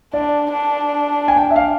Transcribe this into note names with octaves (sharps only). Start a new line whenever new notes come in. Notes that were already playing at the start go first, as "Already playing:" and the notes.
D4 D5
D4
G#5
G5
E5
F5